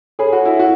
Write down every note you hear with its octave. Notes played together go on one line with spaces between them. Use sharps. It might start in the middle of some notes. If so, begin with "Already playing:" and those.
G#4 A4 C#5 G#5 B5
F#4
E4
F#4